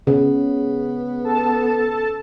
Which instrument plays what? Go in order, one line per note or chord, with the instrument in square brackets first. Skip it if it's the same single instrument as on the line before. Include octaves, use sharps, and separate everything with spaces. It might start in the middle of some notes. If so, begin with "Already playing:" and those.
[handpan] C#3 [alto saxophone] B3
[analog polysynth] A4 A5